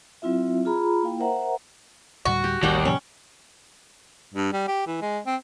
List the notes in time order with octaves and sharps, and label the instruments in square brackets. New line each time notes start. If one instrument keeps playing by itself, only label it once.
[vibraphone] F#3 C4 E4 F4 E5
F4 G#4 A#5 B5
A#3 E4 F5 G5
A#4 C5 E5 F#5 A#5
[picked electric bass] D2 A2 G3 [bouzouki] F#4
[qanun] G4
[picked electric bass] A1 D#3 [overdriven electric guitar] D#2 [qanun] G3 F#5 G5
[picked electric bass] A2 C3 F3 [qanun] C#4
[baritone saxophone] G2
G3
G4
E3
G#3
C4